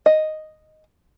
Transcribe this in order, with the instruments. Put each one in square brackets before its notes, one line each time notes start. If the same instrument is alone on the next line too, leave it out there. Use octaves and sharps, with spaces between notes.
[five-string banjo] D#5